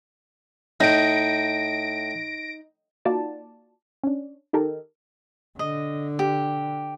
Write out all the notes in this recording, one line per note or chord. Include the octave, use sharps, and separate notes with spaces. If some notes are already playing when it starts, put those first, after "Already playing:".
A2 D#4 A#6 D7
A#3 D#4 F4 F#4 D5 A5
C#4 D4
D#3 D#4 G4 A4 A#4
D3 D#5
G4